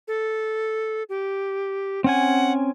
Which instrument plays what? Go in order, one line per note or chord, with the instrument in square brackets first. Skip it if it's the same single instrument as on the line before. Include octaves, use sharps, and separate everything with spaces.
[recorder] A4
G4
[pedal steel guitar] C4 C#4 G#5 [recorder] F#5